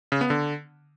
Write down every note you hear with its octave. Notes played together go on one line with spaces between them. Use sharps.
C#3
B3
D3